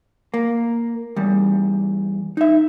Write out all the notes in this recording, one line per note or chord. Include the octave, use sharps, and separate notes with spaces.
A#3
E2 G3
D#4 E5